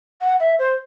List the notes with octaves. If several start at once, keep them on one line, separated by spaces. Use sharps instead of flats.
F#5
E5
C5